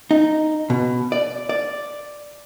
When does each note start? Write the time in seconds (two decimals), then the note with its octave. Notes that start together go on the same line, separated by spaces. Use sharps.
0.11 D#4
0.70 B2
1.12 D5
1.49 D5